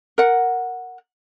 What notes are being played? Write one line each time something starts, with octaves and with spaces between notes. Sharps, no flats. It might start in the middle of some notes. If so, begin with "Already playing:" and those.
A#4 F#5